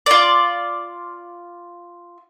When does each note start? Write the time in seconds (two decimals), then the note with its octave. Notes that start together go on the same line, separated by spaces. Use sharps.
0.06 F4 D5